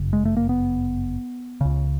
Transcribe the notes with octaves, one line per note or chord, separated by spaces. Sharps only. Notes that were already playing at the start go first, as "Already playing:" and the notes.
Already playing: G1 F#2 C#3
G#3
A3
A#3
B3
C#2 C#3